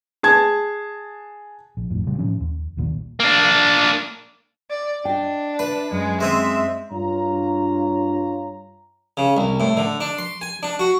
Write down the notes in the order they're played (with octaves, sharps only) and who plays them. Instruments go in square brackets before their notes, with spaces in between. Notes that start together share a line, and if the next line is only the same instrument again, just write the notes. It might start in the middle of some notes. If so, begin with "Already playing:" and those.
[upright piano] G#4 A5 G#6
[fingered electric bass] A#1
G1 F2 A2
A#2 C#3 G3
A2 E3 F3 C#4
D#2
A#1 D#2 A#2
[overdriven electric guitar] A#3 D4
[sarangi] D5
[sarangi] D4 [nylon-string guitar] D#5 G5
[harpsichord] B4 [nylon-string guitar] D5 E5
[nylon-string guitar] F#2 [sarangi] G#3
[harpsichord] G#3 C4 D#6 [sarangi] E5
[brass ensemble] G2 F4 C#5 A#5
[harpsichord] C#3
C2
A2
D3
D4
C6
G#5
D4
F#4